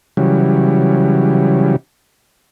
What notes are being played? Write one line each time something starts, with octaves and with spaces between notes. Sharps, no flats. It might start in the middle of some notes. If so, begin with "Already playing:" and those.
C#3 E3 F#3 G3